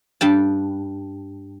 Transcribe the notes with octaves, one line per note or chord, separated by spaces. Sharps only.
G2 G5 A5